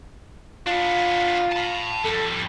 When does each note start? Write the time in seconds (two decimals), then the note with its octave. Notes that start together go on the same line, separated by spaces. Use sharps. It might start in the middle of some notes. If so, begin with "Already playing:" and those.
0.67 B3 D4 F4
1.52 A5 B5
2.04 F2 G3 A4